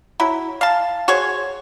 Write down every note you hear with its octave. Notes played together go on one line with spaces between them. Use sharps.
F#3 E4
F5 A5
F#4 G#4 C5 C#5